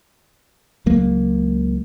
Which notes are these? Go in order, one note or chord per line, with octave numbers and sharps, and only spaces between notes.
C#2 F#3 A#3